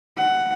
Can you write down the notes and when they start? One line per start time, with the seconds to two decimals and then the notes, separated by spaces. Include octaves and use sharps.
0.18 F#5